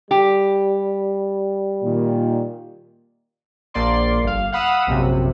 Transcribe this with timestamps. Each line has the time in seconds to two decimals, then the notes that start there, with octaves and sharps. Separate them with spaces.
0.11 G3 G4
1.84 A#2 D#3
3.74 A#1 A#3 D5 C6
4.24 G1 F5
4.52 F5 F#5 B5 D#6 E6
4.87 A#1 F#2 C3